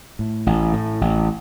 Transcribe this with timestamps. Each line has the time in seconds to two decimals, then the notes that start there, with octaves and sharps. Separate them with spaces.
0.19 A2
0.47 A1
0.73 A2
1.01 A1